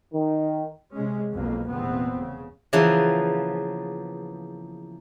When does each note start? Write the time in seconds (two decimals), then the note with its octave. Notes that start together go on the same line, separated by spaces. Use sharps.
0.13 D#3
0.94 C3 G#3 C#4
1.33 B1 F2 B2 A#3
1.68 F1 E2 A#2 B3 C4
2.17 C#3
2.73 C#3 E3 F3 A#3 B3